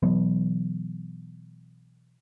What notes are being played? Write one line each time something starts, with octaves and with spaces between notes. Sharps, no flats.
B2 E3 F#3 B3